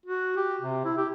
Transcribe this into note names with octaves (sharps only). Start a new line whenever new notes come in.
F#4
G4
C3
E4
G4